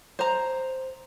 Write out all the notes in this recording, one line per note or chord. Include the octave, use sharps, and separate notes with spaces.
C5 A#5